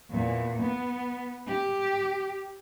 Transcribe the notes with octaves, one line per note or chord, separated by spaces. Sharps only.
E2 A#2
B3
G4